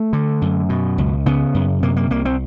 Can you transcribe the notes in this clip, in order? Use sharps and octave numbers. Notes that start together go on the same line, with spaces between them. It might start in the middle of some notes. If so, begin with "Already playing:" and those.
Already playing: A3
D3
F#2
B2
C#2
C#3 B3
F#2
C3 A#3
A#3
C2 A#3
C4